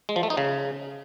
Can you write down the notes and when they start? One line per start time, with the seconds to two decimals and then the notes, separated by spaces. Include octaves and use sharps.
0.09 G#3
0.16 F3
0.23 A3
0.30 D#4
0.37 C#3